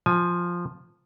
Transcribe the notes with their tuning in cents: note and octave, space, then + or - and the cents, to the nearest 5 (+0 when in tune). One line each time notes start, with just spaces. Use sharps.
F3 +0 G#5 +15